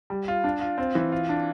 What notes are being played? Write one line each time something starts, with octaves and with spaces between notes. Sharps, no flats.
G3
F4
D4
F4
C4
E3
F4
D4